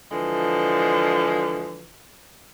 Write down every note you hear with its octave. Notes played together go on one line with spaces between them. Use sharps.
D3 E3 F3 G#3